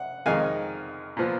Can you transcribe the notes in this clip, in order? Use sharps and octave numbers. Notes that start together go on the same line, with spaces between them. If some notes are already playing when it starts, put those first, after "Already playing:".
Already playing: F#5
F2 D#3 G#3 D#4 F5 G#5
A#2 F3 B3